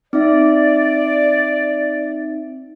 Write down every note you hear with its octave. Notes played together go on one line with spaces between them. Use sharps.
C4 D#4 D5 E5